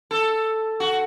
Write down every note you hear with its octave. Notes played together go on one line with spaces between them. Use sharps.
A4
F#4